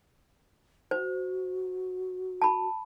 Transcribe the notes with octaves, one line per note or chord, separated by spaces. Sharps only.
F#4 C5
A5 B5